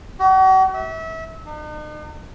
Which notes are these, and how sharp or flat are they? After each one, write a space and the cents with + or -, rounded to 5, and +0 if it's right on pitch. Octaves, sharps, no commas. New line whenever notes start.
F#4 +40
E5 -30
D#4 -45